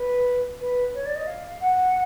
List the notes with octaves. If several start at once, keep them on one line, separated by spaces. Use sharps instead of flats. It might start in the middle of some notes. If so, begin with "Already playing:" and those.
Already playing: B4
B4
C#5
D5
D#5
F5
F#5